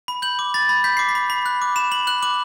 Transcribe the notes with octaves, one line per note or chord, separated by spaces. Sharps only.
B5
G6 F#7
D6
B5 A6
B5
G6 B6
D6 C7
B6
B5
B5
F#6
D6
B5 E7
B5 F#7
F#6 F#7
D6 F#7